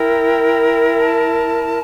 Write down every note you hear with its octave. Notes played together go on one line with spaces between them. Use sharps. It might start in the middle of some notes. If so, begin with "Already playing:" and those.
Already playing: E4 A#4 G5
A5